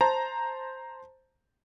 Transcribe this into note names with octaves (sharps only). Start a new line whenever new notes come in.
C5 A5 A#5